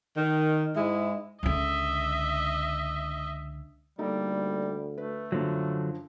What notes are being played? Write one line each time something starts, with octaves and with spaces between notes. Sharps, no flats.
D#3
G#2 G#3 E4
C#2 D3 D#5 E5
D2 G3 A#3 D#4 A4
A3 B4
F#2 D3 F3 F#3